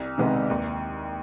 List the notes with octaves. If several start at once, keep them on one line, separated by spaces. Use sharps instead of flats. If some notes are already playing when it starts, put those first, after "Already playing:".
Already playing: C2
C3 D#3 G#3 B3
D#2